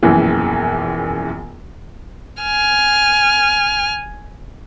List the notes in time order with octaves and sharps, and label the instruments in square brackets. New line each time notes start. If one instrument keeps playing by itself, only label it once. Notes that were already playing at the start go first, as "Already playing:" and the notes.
[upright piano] E1 A#1 F#2 E3
[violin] G#5 F6